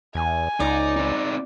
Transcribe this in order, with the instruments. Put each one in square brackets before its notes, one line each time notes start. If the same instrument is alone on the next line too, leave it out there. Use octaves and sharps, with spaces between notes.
[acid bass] E2 [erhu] G#5
[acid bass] C#2 [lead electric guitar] D#4 [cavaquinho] D5
[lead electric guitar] C4 D#4